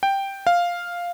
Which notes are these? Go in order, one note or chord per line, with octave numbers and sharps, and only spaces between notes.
G5
F5